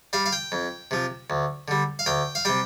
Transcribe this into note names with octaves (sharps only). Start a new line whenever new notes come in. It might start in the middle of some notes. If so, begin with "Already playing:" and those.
G3 F5
F5
G5
F2
C3 F3
D2
D3 G3
F5
D2 G5
F5
C3 G3 G5